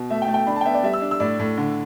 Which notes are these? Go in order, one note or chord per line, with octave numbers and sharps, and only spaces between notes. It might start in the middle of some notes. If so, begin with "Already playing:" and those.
Already playing: B2
A3 E5
G5
A3
G5
D4 B5
A5
G5
B3 E5
D5
G3 E5
E6
D4
E6
A2 D5
A2
D3